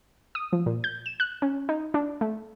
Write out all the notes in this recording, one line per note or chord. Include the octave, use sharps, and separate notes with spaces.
D#6
F3
A#2
G6
E7
F#6
C#4
D#4
D4
A3